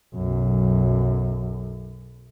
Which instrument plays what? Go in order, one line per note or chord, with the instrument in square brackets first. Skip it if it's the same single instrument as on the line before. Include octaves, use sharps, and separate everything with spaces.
[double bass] B1 F#2